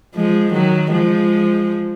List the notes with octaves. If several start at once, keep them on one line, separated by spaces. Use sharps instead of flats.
F3 G#3
D#3 F#3
F3 G#3